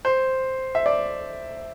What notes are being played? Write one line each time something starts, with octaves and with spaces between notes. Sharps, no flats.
C5
E5
D5